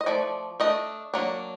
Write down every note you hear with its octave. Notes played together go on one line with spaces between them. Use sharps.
D#5
F3 A3 D5
A3 D4 D#5
F#3 A#3 D4